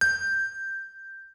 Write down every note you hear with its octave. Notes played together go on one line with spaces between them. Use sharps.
G6